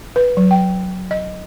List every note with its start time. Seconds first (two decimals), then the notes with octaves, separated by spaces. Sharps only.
0.16 B4
0.37 F#3
0.51 G5
1.11 D#5